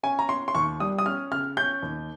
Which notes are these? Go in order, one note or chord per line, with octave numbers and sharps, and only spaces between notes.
C#4 G#5
A#5
C#4 C6
C6
D#2 C#6
G3 D#6
D#6
C#4 F6
C#3 F6
C#4 G6
D#2